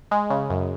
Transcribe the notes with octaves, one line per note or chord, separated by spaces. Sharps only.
G#3
C#3
F#2